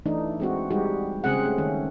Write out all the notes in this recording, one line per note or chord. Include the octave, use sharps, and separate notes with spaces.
E3 A3 D4 D#4
G#3 C4 F#4
G3 G#3 D#4 F#4 G4
C#3 G#3 C4 G#4 F#5
A3
D#3 C#4